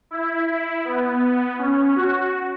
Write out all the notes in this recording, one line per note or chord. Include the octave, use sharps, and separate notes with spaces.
E4
E4
B3
C#4
F#4